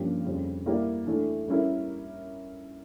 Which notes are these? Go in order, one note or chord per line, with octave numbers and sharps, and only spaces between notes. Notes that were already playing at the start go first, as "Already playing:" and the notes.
Already playing: G2 F3 A#3 C#4 G4
F2 C#3 G3
G3 A#3 E4 G4 D5
E3 A3 D4
G3 C#4 E4 A#4